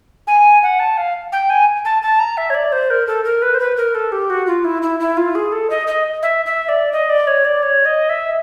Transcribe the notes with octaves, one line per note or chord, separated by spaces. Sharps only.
G#5
F#5
A5
F5
G5
G#5
A5
A5
A#5
E5
C#5
D5
C5
A#4
A4
A#4
B4
C5
B4
A#4
A4
G4
F#4
F4
E4
E4
E4
F4
G#4
A4
D#5
D#5
E5
E5
D5
D#5
D5
C#5
D5
C#5
D#5
E5